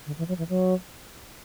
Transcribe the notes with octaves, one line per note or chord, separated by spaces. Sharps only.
D3
E3
F#3
E3
F#3